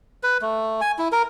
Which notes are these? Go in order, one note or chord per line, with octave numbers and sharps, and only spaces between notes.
B4
A3
G#5
E4
A#4